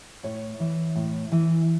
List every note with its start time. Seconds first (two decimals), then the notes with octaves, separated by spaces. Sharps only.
0.23 A2 C#5
0.60 E3
0.96 A2
1.32 E3